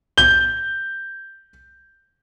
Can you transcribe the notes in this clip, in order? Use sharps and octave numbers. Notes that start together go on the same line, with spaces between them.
G6 G7